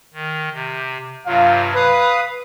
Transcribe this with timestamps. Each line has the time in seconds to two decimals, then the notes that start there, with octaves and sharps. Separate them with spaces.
0.14 D#3
0.54 C3
1.26 G2 C3 F#3 F4 F5
1.75 B4 F5 D#6 F#6